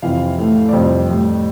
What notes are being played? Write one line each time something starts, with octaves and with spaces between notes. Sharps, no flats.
F2 C3 E3 F5
A2 E3 A3
D5
F2 C3 G3 C5
A2 G3